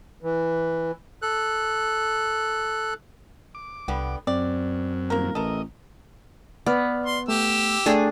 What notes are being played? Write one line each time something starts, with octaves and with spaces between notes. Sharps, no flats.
E3
A4 F#6
D6
C2 D3 G3 B3
F#2 C4 D5
D#1 A#3 A#4
A1 A4 A#4 D#5
B3 D5 F6
C6
A3 G4 E6
A3 D4 G#4 A4 G5